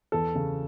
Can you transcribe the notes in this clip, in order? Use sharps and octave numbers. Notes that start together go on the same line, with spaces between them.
E2 A4
C#3